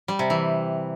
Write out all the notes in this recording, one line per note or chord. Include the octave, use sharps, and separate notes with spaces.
G3
C3
E3